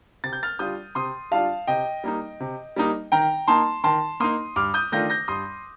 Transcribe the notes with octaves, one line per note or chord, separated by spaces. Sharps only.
C3 A6
G6
F6 A6
G3 D4 F4 D#6 G6
C3 C6 D#6
G3 D4 F4 F5 A5
C3 D#5 G5
G3 A#3 D#4
C3
G3 A#3 D#4
D#3 G5 A#5
A#3 D#4 A5 C6
D#3 A5 C6
A#3 D#4 C6 D#6
G2 D6 F6
D#6 G6
D#3 A3 D4 F4 G6 A#6
G6 A#6
G2 C6 D#6